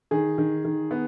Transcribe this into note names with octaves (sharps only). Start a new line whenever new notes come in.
D#3 G#4
D#3
D#3
B3